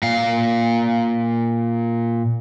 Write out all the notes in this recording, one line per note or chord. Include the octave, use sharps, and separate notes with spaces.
A#2 F5